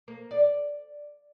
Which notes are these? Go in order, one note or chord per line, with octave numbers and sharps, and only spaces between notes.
A#3
D5